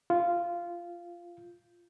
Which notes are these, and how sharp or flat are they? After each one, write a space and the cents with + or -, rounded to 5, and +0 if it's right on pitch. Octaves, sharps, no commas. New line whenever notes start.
F4 -10